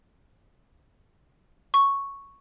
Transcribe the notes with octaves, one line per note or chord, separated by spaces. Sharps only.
C#6